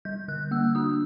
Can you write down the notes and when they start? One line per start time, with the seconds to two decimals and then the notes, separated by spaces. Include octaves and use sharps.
0.05 G3 G6
0.28 D3 F#6
0.51 A#3 E6
0.75 D4 D#6